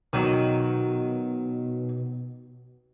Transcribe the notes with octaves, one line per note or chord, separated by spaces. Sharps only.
B2 D#3 F#3